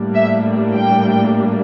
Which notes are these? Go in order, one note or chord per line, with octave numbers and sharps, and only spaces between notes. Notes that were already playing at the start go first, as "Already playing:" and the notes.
Already playing: A2 G3 A#3 D4
E5
G5